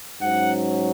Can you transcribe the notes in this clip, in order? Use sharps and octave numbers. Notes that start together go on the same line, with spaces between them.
G#2 F#3 C#4 F#5